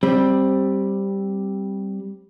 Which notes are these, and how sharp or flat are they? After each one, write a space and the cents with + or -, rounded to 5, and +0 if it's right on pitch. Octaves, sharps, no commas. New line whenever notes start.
G3 +0 C4 +15